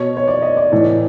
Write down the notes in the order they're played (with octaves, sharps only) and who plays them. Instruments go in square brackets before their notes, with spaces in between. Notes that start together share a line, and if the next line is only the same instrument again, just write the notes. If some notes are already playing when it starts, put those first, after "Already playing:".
Already playing: [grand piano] B2 C#5
C#5
D5
D#5
D5
A2 E3